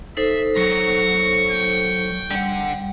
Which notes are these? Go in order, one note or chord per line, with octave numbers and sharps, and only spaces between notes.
D#4 A4 C5 E5
F#3 A#5 C#6
G5
D3 G3 F#5